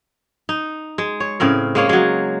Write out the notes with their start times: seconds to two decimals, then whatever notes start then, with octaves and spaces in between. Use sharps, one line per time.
0.49 D#4
0.98 G#3
1.20 C#5
1.40 A2 C#3 C4 A#4
1.75 G#3 A#3 C#5
1.89 F#3 G#3